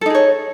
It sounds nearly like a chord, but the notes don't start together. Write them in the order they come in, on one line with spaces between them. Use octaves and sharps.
A4 D#4 G#4 C#5